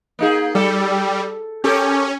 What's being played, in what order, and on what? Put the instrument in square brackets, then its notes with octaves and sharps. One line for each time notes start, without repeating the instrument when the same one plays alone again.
[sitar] A#3 D#4 G#4
[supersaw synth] G3 [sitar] A4
[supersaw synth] C#4 [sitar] G4 A4 A#4